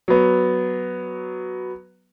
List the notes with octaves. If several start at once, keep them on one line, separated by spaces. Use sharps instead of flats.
F#3 B3